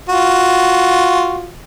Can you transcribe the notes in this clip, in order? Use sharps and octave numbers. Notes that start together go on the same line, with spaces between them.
F4 F#4